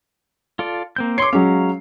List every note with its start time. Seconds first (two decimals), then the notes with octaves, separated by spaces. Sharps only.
0.59 F4 A4 D5
0.96 A#3 C4 G6
1.18 C#5 C6 D6 C7
1.33 F#3 G#3 C#4 F5 A#5